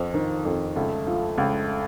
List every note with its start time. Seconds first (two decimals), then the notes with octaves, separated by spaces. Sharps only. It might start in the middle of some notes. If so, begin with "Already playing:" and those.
Already playing: F2 C4
0.14 D#3
0.45 F2
0.76 C#2 A3
1.07 F3
1.38 C#2